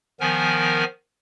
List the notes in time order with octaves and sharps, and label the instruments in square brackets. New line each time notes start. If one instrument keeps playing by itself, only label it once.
[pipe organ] D#3 F3 B3 A#4 G#5